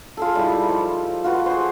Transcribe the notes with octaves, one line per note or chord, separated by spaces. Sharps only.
F4 G#4 A4
G3 D#4 E4
F3
F4 F#4 B4
G#4 C5